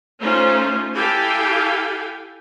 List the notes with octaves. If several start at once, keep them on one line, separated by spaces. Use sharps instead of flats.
A3 C#4 D#4 F4 C5
E4 G4 A4 F5 G5 G#5